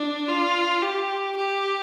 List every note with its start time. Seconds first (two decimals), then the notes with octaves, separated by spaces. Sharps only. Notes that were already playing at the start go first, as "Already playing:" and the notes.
Already playing: D4
0.28 F4
0.82 G4
1.36 G4